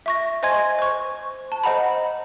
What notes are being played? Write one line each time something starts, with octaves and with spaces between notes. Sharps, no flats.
E5 C#6 A#6
C5 D#5 G#5 C6 G#6
C5 C#6
A5
C5 D#5 F#5 A#5 B5